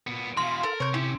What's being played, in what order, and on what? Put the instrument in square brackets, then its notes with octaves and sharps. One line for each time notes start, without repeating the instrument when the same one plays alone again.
[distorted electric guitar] A#2 B3
[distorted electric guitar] B2 E3 [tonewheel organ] F5 [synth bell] C6
[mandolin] A4 [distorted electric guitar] A#4
[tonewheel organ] C3 [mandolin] C#5 G6
[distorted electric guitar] C#4 G4 [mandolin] E4